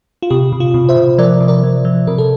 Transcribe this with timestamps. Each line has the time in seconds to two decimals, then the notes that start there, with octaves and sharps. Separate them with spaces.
0.22 F4
0.30 C3 G4
0.53 C3
0.60 F4
0.74 C3
0.89 C5 E5
0.97 C3
1.18 F3 A#4 D5
1.40 C3
1.48 A#4 D5
1.64 F3
1.85 F3
2.07 C3 A#4
2.18 A4